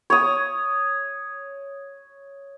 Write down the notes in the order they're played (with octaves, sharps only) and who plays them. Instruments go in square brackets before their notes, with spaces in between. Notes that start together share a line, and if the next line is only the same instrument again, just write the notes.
[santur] C#5 D#6